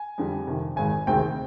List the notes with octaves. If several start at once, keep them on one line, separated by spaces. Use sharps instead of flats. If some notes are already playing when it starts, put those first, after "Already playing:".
Already playing: G#5
F2 D3 G3
F2 C3 D#3
G#1 G#2 D#3 G#5
D2 C3 D#3 G#3 C4 G5